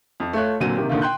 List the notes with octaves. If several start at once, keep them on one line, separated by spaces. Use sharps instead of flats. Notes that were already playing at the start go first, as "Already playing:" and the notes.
F2
A3 F4 C#5 F#6
A#2 D3 F#3 C4 D#7
C3 D#3 A#3 G4
A#2 D3 D#3 F4
G5 C6 F#6 G6